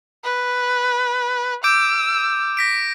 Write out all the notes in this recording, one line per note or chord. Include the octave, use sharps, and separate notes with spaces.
B4
D6 E6 G6 D7
A#6 B6 D7